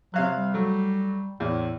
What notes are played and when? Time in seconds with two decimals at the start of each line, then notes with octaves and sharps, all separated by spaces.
0.14 C3 F#3 F5 F#6
0.36 G3
0.54 F#3 A3
1.40 E2 A2